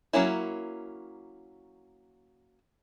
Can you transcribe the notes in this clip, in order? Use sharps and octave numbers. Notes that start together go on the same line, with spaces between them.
F#3 A#3 C#4 E4